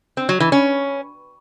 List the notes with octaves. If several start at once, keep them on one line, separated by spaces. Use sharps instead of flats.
C4
F#3
E3
C#4